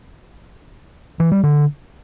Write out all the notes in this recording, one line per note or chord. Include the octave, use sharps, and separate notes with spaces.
E3
G3
D3